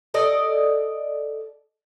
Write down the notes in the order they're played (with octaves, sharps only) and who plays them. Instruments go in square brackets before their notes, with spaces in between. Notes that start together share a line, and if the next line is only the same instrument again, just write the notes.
[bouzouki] A4 D5 D#5